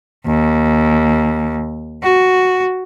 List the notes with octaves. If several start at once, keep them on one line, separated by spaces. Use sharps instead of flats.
D#2
F#4